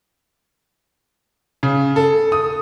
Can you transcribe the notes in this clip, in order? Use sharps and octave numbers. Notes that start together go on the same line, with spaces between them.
C#3
A4
D#6